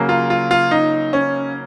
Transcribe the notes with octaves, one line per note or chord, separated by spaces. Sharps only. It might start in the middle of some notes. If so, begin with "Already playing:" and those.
Already playing: C#3 F#3 A#3
F4
F4
F4
D#4
C#4